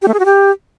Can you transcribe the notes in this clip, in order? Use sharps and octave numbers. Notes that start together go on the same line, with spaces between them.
G4
A3
G#4
F#4
G4